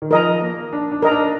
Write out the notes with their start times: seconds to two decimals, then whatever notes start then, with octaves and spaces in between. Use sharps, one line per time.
0.02 D#3
0.11 F3 A#4 D#5 A#5
0.41 A#3
0.73 D4
0.92 D4
1.02 A#4 D#5 A#5
1.11 D4